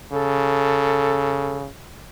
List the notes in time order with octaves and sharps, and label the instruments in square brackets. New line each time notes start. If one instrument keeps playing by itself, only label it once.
[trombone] C#3 [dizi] A4